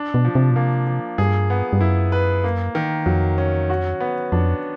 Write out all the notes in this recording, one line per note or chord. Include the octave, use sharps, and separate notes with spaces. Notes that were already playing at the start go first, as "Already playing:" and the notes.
Already playing: D4
B2
F3
C3
B2
C3 A#3
F3
G2 G#4
B3
G2
F#2 E4
B4
A#3
D#3
F2 F#3
C#4
F#4
B3
F2 D4